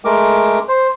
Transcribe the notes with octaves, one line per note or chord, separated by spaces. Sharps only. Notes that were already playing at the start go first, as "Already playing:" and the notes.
G#3 A3 A#4 D6
C5